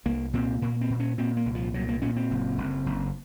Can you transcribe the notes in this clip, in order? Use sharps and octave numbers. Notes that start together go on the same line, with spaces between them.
C2 A#3
A#2 C4
A#2 A#3
C4
A#2
C#4
A#2 C4
A#3
C2
F3
A#2 F#3
A#3
A#2 C#4
C4
F#1
F#1
F#1